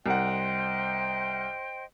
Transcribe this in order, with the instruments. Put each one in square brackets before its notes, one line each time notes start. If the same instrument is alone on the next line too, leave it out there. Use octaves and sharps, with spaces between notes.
[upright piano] C2 F#5 [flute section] C5 D#5 G5